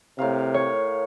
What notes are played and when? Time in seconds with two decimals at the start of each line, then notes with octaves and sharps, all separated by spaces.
0.19 A2 C3 A#4 F5
0.54 C#5